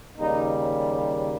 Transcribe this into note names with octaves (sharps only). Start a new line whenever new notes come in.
D#2 C#3 G3 A#3 D#4